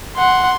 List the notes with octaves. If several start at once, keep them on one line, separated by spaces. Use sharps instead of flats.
F#5 C6